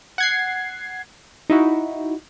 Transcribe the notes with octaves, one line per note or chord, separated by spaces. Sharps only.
F#5 G#6 C7
D#4 E4 F#4